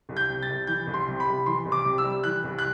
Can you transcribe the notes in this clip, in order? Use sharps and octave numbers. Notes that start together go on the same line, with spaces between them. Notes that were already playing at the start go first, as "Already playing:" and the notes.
C2
G6
C3
A6
C2
E3 G6
C2
C6
C3
B5
C2
E3 C6
C2
D6
C3
E6
G3
E3 F#6
C2
F#6